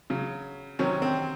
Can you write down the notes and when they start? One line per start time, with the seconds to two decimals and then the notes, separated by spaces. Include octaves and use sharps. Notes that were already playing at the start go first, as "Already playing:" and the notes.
0.10 C#3 F#3
0.79 C3 D#3 F#3 C#4
1.02 C4